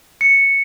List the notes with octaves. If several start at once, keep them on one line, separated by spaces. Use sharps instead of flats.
C#7